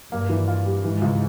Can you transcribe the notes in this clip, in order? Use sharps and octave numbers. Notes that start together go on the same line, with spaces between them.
G2 A#3
E3
F4
G3
G#2 E3
C#2